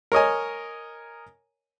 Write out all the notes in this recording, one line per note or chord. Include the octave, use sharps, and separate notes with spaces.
A#4 C#5 D#5 G#5